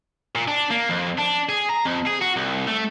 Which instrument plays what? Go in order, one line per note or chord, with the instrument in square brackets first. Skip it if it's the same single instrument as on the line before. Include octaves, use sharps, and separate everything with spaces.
[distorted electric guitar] A#2
D4
A#3
F2
D4
G#4
A#5
F2
G#4
F#4
C2
A3